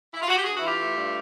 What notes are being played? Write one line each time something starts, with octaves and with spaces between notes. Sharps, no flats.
E4
F4
F#4
G4
G2 F#4 G#4
E4 F#4
E3
F4 G4
A3
G2